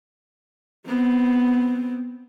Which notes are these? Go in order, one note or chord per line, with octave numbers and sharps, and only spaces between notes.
B3 C4